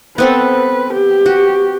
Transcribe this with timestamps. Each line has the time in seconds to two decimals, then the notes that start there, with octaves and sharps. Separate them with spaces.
0.18 B3 C4 A4 B4
0.93 G4
1.26 F#4